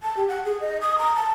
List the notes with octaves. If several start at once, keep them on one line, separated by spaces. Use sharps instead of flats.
A5
G4
F#5
G#4
D#5
D#6
A#5
A5